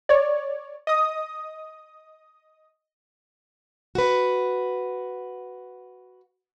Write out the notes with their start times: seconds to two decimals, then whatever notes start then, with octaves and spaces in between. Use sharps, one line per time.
0.09 C#5 D5
0.87 D#5 D#6
3.95 F#4 B4